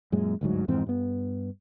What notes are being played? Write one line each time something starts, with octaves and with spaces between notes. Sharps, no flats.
F#2 A#2 G#3
G1 D2 G#2 F#3
F2 G#2 E3 C4
G2 B3